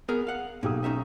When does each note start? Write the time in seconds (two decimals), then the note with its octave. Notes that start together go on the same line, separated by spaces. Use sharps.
0.08 B3 G#4 A#4
0.27 F5 F#5
0.63 B1 A#3 G4 D#6
0.84 C#4 D#4 E5